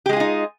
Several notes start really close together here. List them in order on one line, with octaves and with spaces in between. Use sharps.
G4 G#3 G#4 F4 D#4